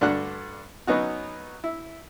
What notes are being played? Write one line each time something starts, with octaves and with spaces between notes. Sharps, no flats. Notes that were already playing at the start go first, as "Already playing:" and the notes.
G2 D3 D4 F#4 F#6
F#3 B3 C#4 D#4 F#4
E4